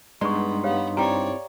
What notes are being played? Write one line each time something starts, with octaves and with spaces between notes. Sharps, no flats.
G2 G#3 B3 D#4 D5 C6 C#6
B3 G4 C#5 F5
C4 E4 G4 C#5 D5 G5 A#5